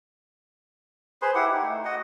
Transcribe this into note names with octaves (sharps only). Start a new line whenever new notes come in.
G#4 B4 C5 C6
E4 G4 F#5
D#4
A3
F#4 D#5 F#5